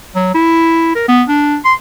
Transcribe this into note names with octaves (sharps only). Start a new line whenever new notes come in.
F#3
E4
A#4
B3
D4
C6